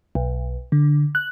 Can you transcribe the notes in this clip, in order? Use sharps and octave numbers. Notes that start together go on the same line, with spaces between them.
B1
D3
F#6